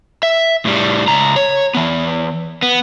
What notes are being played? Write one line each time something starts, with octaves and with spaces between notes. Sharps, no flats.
E5
A2 G3
C#2 A#5
C#5
E3 B3
B3